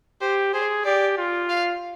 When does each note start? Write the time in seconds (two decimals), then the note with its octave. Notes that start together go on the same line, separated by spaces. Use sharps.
0.21 G4 C5
0.53 G#4 C5
0.85 G4 D5
1.17 F4
1.49 F5